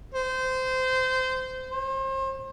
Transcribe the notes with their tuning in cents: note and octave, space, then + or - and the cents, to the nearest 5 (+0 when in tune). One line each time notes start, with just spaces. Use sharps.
C5 -20
C5 +35